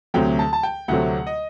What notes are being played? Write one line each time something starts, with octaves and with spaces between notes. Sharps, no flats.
D2 C3 F#3 A3 C4 G5
A5
A5
G5
D2 C3 F#3 A3 C4 F#5
D#5